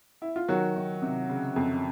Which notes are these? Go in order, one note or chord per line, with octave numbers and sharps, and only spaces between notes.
E4
F4
D#3 F#3 F#4
D#3
C3
C#3
F2